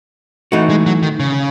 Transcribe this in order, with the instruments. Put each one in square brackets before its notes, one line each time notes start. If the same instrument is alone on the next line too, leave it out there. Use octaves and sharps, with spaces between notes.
[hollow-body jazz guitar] E3 A3 D#4 F#4
[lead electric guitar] G#3
F#3
D#3
C#3